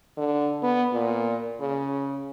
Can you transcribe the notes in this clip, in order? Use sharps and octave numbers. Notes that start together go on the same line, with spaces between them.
D3
B3
A#2
C#3